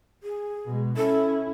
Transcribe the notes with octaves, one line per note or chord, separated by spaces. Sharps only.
G#4
B2 G#3
C#4 E4 A4